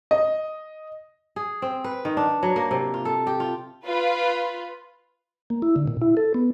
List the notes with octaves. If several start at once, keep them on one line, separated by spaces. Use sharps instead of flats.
D#5
G#4
C4
B4
D#3
D4
F#3
A#3
C3
F4
A4
G4
F4
F4 B4
A#3
E4
D3
A#2
E4
A4
B3